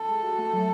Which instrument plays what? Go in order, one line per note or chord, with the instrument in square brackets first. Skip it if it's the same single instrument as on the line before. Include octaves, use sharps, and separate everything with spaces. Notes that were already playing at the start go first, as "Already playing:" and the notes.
Already playing: [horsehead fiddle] A4
[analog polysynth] G#3
F#4
A3
F#3